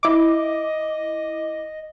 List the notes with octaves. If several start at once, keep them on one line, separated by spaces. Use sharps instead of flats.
E4 D#5 D6